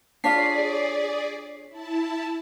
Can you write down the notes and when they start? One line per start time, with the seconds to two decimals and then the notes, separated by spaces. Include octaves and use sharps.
0.24 D4 F4 G#4 C#5 D5 B6 C7
1.69 E4 A5